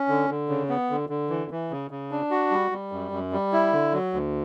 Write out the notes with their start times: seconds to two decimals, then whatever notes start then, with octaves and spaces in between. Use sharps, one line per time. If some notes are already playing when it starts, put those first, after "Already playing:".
Already playing: C#4
0.08 D3
0.30 D3
0.49 C#3
0.69 B3
0.90 D3
1.09 D3
1.30 E3
1.51 E3
1.71 C#3
1.91 C#3
2.11 D4
2.31 F#4
2.51 G3
2.71 G3
2.92 F#2
3.11 F#2
3.32 G3
3.53 E4
3.73 D3
3.93 F#3
4.13 D2